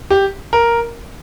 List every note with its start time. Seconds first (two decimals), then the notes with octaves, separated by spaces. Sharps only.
0.10 G4
0.53 A#4